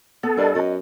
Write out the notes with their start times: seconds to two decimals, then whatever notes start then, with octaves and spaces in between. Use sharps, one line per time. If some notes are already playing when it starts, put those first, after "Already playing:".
0.23 B3 A4
0.37 G2 A#4 D5 D#5
0.55 F#2 D#5